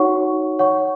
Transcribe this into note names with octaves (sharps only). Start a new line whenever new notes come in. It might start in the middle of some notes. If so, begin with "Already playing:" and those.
Already playing: D#4 F#4 C#5 F#5 C#6
C#5 F#5 C#6